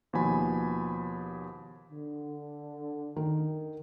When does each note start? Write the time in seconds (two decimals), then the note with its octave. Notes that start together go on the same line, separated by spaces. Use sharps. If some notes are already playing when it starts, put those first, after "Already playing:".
0.13 D#2 B2 F3 G#5 B5
1.91 D3
3.16 D#3